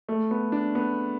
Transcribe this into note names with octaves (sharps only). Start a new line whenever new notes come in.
A3
B3
D4
B3